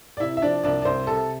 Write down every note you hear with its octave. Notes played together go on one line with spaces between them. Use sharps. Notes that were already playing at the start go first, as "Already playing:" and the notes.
D5
C3 E4 E5
E5
F3 D4 D5
C2 D4 D5
D5
C2 C4 C5
C3 A4